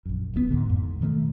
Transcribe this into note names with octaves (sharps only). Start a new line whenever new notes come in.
A#1 F#2
D1 C#2 D3 B3
G#2 B2 D3
F2 G#2
B2 D#3 F#3 A3